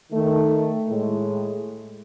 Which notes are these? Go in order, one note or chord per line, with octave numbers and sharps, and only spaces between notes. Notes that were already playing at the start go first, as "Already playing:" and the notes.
D#3 A3
A2 G#3